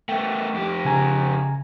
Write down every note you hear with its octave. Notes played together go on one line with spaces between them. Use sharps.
A3 B3 G5
F2 G4
C#3 G#5 A#5